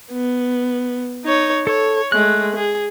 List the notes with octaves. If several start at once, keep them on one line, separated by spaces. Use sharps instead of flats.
B3
D#4 C#5
A4 C#5
G#3 A3 F#6
G#4